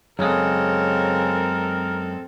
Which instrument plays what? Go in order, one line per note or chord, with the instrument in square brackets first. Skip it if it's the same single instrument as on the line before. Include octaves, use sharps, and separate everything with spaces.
[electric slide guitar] F#2 G#3 [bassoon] C#3 [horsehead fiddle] C4 A4 [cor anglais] A#4